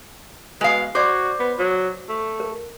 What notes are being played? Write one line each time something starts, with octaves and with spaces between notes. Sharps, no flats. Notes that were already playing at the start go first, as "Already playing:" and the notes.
B2 G#3 F5
F#4 C5 D5 D6
B3
F#3
A3
A#4